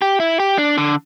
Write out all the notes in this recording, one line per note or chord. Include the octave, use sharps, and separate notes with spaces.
G4
E4
G4
D4
D3